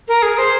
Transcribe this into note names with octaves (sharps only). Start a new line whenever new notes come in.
A#4
G#4
C5